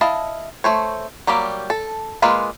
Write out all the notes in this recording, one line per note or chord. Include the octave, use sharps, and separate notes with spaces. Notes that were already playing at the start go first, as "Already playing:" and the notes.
E4 D#5 F5 A5
A3 C5 C#5
F#3 G3 A#3 G4
A4
G#3 A#3 F4 B4